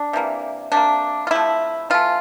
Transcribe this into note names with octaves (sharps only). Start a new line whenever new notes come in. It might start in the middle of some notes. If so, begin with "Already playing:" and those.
Already playing: D4
C3 E3 A#3
C3 G3 A#3 D4
F4
C3 F3 A3 E4
E3 A3 F4